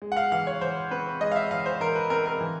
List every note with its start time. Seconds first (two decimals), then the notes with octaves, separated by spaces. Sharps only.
0.02 G#3
0.12 F#5
0.17 F5
0.32 E3 F5
0.47 C#5
0.61 E3 C5
0.91 C4 B4
1.21 G#3 D#5
1.32 F5
1.36 E5
1.51 E3 F5
1.66 C5
1.80 E3 A#4
1.95 B4
2.10 C4 A#4
2.26 A#4
2.41 E3